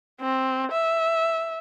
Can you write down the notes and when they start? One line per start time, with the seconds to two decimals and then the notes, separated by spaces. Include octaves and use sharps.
0.21 C4
0.71 E5